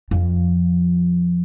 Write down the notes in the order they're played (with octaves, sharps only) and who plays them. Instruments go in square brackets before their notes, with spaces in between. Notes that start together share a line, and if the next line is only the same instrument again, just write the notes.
[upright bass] F2 F3